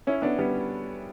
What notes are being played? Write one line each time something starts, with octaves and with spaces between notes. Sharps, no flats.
C#4 E4
B3 D4
G3 B3